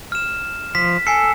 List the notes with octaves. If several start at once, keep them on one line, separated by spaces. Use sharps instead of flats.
F6 E7
F3 B6
A4 G#5 C7 C#7